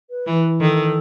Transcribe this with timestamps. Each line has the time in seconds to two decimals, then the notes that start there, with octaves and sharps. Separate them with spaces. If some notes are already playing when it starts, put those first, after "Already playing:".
0.10 B4
0.27 E3
0.60 D#3 A4